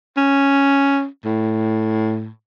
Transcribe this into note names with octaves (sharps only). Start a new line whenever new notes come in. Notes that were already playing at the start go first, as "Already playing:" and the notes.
C#4
A2